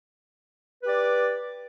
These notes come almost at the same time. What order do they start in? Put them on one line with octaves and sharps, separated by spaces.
B4 G4 D5